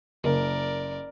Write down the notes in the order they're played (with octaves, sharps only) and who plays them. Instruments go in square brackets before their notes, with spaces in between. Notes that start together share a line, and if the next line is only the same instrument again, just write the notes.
[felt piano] F#1 [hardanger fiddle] A#4 D5